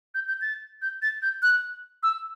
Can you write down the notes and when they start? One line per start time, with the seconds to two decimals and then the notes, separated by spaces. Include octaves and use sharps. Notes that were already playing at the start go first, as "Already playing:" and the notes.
0.15 G6
0.28 G6
0.41 A6
0.82 G6
1.02 A6
1.22 G6
1.43 F#6
2.03 E6